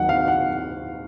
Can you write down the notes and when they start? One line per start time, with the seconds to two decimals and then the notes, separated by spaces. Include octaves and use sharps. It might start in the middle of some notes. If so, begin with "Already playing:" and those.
Already playing: D#2 D#3 F#3 F#5
0.09 F5
0.28 F#5